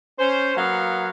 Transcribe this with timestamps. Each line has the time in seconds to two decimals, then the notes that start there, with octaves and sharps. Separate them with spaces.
0.18 C#4 C5
0.56 F#3 A#3 B3 F5 F#5